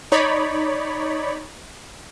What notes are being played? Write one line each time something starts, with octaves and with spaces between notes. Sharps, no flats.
D#4 C#5 D5 B5